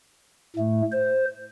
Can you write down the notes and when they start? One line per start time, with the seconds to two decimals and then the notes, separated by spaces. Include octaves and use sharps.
0.56 A2 A3
0.92 C5